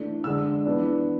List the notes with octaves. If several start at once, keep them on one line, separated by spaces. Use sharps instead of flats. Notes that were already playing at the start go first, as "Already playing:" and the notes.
Already playing: E3 A3 D4
D3 G#3 D4 E6
E3 B3 D4